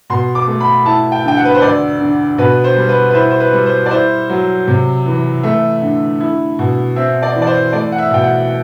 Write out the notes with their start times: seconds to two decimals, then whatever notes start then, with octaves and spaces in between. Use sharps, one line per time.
0.10 B2 C6
0.35 D6
0.48 A3
0.61 B5
0.86 E4 A5
1.12 G5
1.25 D3 G5
1.37 F#5
1.45 B4
1.54 C5
1.62 D2 D5
2.01 D3
2.38 B2 B4
2.64 C5
2.77 G3
2.89 B4
3.11 B4
3.14 E4 C5
3.31 C5
3.40 B4
3.53 G3
3.66 C5
3.86 D5
3.91 E4 C5
4.30 F#3
4.68 C3
5.06 E3
5.43 A3 E5
5.82 D3
6.20 E4
6.59 B2
6.96 C4 E5
7.22 D5
7.35 E3
7.42 D5
7.47 C5
7.73 A3 D5
7.92 F#5
7.98 E5
8.11 B2 G5
8.23 F#5